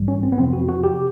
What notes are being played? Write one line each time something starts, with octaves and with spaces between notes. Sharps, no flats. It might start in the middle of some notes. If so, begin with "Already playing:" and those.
Already playing: A#1 G#2 E3 G3
C#4
C4
B3
F2 C3 F3 C4
F#4
F#4
G4